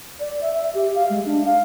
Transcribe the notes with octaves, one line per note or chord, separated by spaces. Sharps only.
D5
E5
E5
G4
F5
G#3
D4
F5